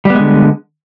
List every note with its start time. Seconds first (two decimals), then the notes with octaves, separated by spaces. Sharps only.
0.05 G3
0.10 B3
0.15 G#3
0.20 D3